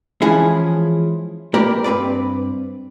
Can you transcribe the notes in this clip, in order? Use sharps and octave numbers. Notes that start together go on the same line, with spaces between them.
E3 F3 G#3 C#4 E4 G#4
A#3 G4 A#4 B4 D5
G2 C4 B4 D5